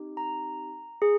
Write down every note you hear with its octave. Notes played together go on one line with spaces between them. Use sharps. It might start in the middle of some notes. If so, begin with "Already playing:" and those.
Already playing: C4 D#4 G4
A#5
G#4